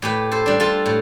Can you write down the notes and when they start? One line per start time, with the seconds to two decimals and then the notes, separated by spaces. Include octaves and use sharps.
0.02 A2 G4 B4
0.31 A4 C5
0.46 G3 D4
0.60 F4 A4
0.86 A2